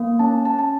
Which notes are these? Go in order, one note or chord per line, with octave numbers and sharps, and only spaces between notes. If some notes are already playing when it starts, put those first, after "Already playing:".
Already playing: A#3
C#4 A5
C#4 A5
A5